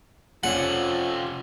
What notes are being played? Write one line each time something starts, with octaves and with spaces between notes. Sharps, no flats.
F2 C3 C#4 F4 A4 D5 F#5